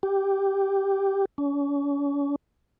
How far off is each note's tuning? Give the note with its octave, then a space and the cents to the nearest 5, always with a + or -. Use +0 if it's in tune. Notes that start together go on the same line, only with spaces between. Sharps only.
G4 +0
C#4 +40